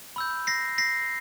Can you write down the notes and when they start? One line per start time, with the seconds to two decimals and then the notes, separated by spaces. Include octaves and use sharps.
0.16 B5 E6 G6
0.47 A#6 C7
0.78 A#6 C7